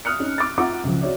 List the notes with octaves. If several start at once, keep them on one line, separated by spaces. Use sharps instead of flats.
D#6 F6 F#6 C#7
C#4 D#4
D6 A6
F4 F#5 A#5 D6
C#2 F3
F#4 C#5 D5 E5